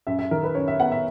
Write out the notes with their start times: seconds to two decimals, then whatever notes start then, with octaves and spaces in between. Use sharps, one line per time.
0.07 F#2 E5
0.19 E5
0.31 D#3 A#4
0.43 B4
0.55 F#2 C#5
0.68 E5
0.80 B3 F#5
0.92 E5